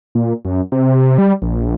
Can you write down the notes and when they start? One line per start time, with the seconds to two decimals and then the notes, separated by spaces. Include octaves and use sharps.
0.15 A#2
0.45 F#2
0.72 C3
1.18 G3
1.42 A#1